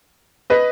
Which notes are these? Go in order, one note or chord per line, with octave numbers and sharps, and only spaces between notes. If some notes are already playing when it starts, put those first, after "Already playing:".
B4 D#5